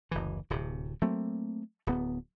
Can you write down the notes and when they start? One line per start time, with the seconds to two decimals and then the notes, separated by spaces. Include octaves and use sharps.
0.11 F#1 D2 E3
0.50 D1 C3
1.02 F#3 A3 A#3 C4
1.87 D1 B3